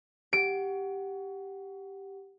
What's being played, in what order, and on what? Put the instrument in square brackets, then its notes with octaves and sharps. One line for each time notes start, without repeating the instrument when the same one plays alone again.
[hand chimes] G4 F#5 [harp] D7